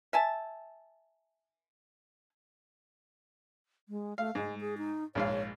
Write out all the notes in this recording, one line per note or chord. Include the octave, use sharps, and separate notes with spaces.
E5 G#5 A5
G#3
A3 F5
G#2 G#3
G#4
D#4
A#1 G#2 C#5 F5